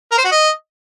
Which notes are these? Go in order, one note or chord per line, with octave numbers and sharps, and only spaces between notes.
A#4
C5
F#4
D#5